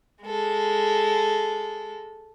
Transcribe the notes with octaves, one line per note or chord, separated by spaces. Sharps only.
G#3 A4